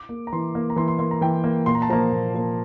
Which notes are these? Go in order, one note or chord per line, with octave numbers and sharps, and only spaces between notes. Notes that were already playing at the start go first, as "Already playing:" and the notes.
Already playing: D6
A#3
A#5
E3 C6
A#3
A#5
E3 C6
C6
A#3 C6
A#5
E3 G5
A#3
A#2 C6
A#5
A5
F3 A#3 A#5
A#2
F3 A#3